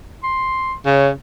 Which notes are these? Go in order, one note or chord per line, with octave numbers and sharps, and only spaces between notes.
C6
C#3 C#5